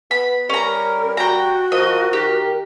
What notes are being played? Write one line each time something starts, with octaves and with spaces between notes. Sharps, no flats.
B3 B5
G3 C#4 A#4 A#5
F#4 G5 A#5
F3 A#4 D#5
D#3 G4